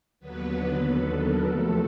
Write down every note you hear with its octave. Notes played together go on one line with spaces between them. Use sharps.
D#2 D3 F#3 B3 B4
A4
A#4
E2 C3 F3 A3 A4